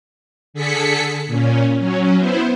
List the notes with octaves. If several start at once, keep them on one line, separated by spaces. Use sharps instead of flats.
D3 G#4 A4 B6 C#7
A#2 C#4
F#3 C#4
B3 E4 C5